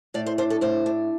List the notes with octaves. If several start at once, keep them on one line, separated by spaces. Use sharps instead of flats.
A2 D5
C5
D4 C5
A4
A2 C5
D4